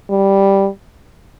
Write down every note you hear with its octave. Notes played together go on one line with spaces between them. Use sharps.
G3